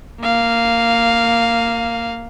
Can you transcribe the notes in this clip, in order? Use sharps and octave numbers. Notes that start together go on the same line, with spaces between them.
A#3 F5